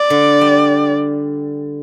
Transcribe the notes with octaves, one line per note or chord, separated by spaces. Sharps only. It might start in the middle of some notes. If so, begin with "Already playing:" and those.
Already playing: D5
D3
G3